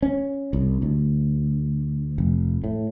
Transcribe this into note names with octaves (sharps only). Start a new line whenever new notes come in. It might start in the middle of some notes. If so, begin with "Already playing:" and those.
C#4
C2
D2
F1
A2